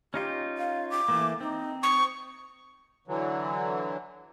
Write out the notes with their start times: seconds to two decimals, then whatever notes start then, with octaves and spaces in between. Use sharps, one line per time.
0.14 C#4 D#4 F4 G4
0.58 F5
0.90 D6
1.08 E3 A3 A#3
1.40 C4 D#4
1.83 C#6 D#6
3.08 D3 E3 F#3